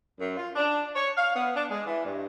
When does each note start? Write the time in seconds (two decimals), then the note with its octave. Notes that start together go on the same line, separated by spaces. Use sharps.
0.19 F#2
0.37 F4
0.56 D4
0.96 C#5
1.17 F5
1.35 B3
1.55 D4
1.70 G#3
1.86 E3
2.05 G2